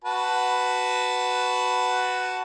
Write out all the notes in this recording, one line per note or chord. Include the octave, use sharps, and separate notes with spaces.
F#4 B4 A5